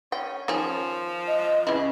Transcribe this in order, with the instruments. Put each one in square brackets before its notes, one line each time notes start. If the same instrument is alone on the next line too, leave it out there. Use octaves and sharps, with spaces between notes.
[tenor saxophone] C#4 [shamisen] G5
[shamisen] D#3 C#4 G#4 [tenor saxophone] F3 [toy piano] A#4
[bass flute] D#5
[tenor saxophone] C#3 [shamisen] E3 E4 [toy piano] C#4 B4